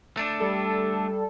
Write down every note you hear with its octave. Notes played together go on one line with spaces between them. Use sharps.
A3 D4
G3 A4